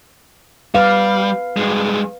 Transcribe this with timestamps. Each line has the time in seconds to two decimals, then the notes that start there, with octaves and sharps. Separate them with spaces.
0.75 G3 B4 F5
1.57 G2 G#3